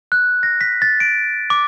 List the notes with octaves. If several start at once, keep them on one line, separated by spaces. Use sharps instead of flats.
F#6
A#6
B6
A6
D7
D6